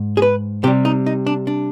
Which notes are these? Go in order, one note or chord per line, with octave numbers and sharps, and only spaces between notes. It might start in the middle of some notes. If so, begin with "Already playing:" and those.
Already playing: G#2
G#4
B4
C3 G3 G4
D#4
D#4
D4
D4